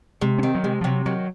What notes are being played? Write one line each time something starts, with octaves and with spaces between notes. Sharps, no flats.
C3 G#3
C#4
D#3 C4
F#3
C3 G#3
F3
C3 F#3
D#3 F#3